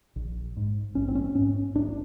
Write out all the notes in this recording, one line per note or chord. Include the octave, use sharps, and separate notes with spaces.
A#1
G#2
A#1 C#4
C4
C#4
G#2 C#4
A#1 D4